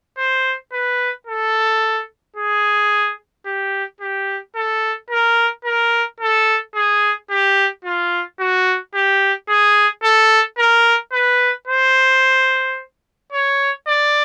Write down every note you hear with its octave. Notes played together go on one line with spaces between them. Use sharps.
C5
B4
A4
G#4
G4
G4
A4
A#4
A#4
A4
G#4
G4
F4
F#4
G4
G#4
A4
A#4
B4
C5
C#5
D5